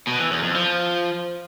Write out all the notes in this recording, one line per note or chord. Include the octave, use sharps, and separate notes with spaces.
B2
E3
E2
F2
F3